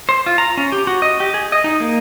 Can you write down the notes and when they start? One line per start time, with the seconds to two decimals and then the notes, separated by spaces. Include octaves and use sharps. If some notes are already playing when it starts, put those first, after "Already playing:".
0.09 C5
0.26 F4
0.38 A#5
0.57 C#4
0.72 G4
0.87 F#4
1.02 D#5
1.20 G4
1.34 G#4
1.52 D#5
1.64 D#4
1.80 A#3